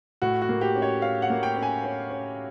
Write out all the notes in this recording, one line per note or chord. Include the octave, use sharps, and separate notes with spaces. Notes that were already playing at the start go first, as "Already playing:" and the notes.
A2 F#4
F#4
A#3
G4
C#4
C#5
C#4 F5
F#5
A#3
G5
C#4
G#5
C#4
C#4